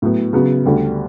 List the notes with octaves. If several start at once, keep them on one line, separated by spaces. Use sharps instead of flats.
A2 F#3 B3
C#3 F#3 B3
D2 D3 G3